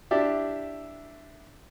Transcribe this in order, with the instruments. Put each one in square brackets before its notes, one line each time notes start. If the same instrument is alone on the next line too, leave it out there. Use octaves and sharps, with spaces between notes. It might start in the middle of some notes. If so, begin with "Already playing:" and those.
[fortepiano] D4 E4 G4 D5 E5